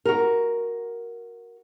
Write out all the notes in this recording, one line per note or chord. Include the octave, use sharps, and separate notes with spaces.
F#4 A#4